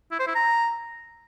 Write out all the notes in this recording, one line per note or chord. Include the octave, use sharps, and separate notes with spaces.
E4
C5
E4
A#5